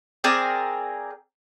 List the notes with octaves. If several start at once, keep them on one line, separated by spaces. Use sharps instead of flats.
C4 G#4 A#4 D5